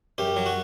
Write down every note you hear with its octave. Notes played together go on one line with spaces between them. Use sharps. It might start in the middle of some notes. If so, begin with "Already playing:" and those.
F#2 G4
F#3
F#4